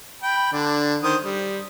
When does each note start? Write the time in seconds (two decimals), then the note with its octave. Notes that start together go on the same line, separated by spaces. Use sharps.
0.23 G5 B5
0.52 D3 D4
1.03 D#3 C5 D#6
1.23 G3